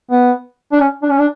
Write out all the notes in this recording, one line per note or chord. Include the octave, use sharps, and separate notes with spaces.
B3
D4
C#4
D4
C#4
D4